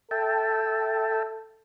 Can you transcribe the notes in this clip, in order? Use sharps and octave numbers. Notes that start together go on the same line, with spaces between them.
A4 E5 G5 A5